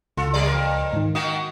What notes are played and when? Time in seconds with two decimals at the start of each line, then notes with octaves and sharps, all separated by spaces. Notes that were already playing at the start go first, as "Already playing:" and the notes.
0.17 C#2 F4 A4
0.33 G3 A#3 D5
0.47 F2 A#4
0.93 G#2 D#3
1.15 D#3 A#3 F#4 D#6